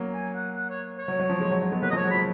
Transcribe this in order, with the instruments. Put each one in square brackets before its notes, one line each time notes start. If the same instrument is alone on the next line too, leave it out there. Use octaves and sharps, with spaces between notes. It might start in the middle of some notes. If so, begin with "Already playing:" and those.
Already playing: [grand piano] F#3 A#3
[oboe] G#5
F#5
F#5
C#5
C#5
[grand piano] F#3
F#3
F3
F3 G#3
F#3
F#3
G#3 B3
[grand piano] F#3 A#3 [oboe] B4
[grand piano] F3 G#3 [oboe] D#5
[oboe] C#5
[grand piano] F#3
[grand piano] F3 [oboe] B5